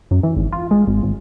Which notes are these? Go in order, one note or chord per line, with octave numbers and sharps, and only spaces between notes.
F#2
E3
G#1
F4
G#3
G#1
G#1